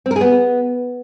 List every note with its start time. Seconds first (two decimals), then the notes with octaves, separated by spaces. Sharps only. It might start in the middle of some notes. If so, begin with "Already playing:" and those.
0.06 C4
0.11 A#4
0.16 G#4
0.21 B3